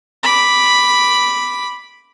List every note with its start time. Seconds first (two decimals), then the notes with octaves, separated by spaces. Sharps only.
0.23 B5 D6